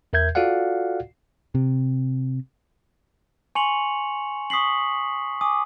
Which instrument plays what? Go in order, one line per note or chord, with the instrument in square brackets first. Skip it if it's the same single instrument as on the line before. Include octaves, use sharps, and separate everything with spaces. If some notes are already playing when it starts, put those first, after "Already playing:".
[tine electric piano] E2 A#4 E5 G6 G#6
F4 F#4 A4 D5 F5 F#5
[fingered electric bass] C3
[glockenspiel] G#5 C6 C#6 C#7 F7 F#7
C#6 D#6 B6 C7 F#7
G#5 D6 D#6